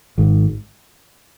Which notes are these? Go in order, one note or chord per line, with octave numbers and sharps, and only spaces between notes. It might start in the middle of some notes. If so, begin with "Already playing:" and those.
G#1 G#2